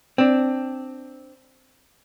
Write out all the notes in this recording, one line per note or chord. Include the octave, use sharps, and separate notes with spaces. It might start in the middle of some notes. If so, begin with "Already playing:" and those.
C4 D4